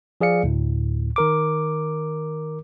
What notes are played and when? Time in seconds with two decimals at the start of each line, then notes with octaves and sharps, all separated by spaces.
0.21 F3 G#4 D5 F5 C#7
0.43 D2 A2
1.16 D#3 A#4 D6